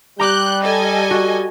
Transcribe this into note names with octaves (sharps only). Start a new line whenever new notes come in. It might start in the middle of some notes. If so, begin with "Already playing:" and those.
G3 A#5 D6 F#6 G6
A4 D#5 G#5
F#4